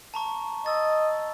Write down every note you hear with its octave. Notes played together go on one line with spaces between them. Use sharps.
A5 A#5 C#6
D#5 E6 A6